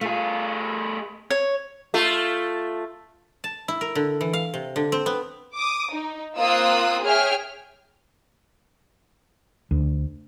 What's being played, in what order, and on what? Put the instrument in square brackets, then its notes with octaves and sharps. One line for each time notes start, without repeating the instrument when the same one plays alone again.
[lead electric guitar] A3 G#4 [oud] F4
[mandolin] C#5
[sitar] A3 F4
[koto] A5
E4
A#4
D3
E3
F5
C3
D3
C4
B3
[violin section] D6 D#6
D#4
A#3 C4 F4 D#6 E6 F#6
G#4 C#5 E5 G5 F6
[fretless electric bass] D2